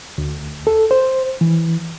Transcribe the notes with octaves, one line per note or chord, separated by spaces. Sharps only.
D2
A4
C5
E3